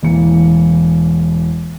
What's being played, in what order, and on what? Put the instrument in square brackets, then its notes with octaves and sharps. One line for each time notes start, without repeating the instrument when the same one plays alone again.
[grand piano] E1 A1 E3 A#3 C#7